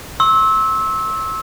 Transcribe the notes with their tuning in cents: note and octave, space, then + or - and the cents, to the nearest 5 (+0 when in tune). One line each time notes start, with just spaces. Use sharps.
C6 +45 E6 -20